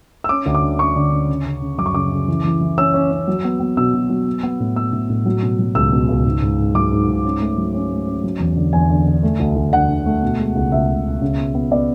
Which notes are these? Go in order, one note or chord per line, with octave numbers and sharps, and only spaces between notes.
E6
C#4 D6
D2
D6
D3
C#4 C#6
D3
C#4
C#3
C#3
C#3
F#2 D6
C#6
C#3 D6
C#3
E3
E3
E3
C#4 E6
C#4
C#4
F#3
B3
B3
B2 E6
B2
F#3
B3
B3
A2
B3 E6
A2
A2
F#3
B2
F#3
C#2 E6
B2
C#2
G#2
G#2
G#2
F#3 D6
G#2
G#2
C#4
A3
F#3
C#4
A3
C#4
F#3
E2
D3
E2 G#5
D3
D3
A3
D2
D2
D3 F#5
D3
A3
B2
G#3
C#2
C#2 E5
C#2
B2
C#3
B3
B3
B3 D5